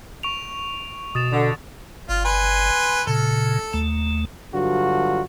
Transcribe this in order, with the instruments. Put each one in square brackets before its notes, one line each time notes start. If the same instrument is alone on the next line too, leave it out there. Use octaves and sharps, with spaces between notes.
[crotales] C#6 D7 F7
[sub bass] B2 [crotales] D#6 A6 E7
[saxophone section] D3
[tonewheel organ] G1 [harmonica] F4
[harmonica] B4 G#5 C6
[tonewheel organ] A#2 C#3 [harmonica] A4
[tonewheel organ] D#2 A3
[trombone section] G2 D3 F#3 F4 F#4